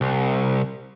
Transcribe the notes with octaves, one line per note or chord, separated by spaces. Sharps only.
C2